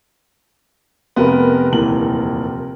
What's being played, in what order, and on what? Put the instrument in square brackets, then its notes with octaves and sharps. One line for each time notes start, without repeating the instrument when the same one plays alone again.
[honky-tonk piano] F1 A#4 [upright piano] B3
[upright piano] D#1 E3 F#7